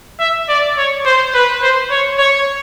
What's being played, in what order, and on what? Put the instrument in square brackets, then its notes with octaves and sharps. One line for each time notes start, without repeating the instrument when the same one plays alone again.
[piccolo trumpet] E5
D5
C#5
C5
B4
C5
C#5
C#5